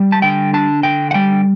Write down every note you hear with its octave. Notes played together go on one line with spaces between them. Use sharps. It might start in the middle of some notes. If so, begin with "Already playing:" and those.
Already playing: G3
A5
D3 G5
D4 A5
D3 G5
F#5
G3 G5